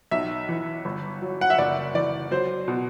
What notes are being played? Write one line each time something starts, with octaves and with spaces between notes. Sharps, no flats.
B1 E5
E3
G1
F#3
F#5
E5
F#1 D5
E3 D5
F#3 C5
B2